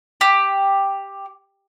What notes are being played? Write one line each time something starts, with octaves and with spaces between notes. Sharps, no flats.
G4